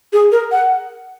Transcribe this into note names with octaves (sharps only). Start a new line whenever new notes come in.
G#4
A#4
F#5